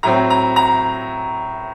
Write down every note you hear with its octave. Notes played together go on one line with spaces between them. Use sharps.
A2 F#3 C4 A#5
A#5
A#5